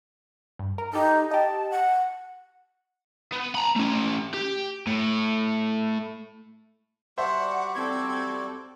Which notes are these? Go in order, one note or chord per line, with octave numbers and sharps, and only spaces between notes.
G2
A#4
D#4 G4 A4
G4 D#5 A5
F#5
B3
A#5 B5
A3 C#4
G4
A2
G3 F#4 C5 D5 E5 F#5 A5
C4 A4 G#6